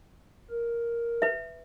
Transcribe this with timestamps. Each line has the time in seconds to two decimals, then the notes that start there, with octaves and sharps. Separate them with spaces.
0.50 A#4
1.22 B4 E5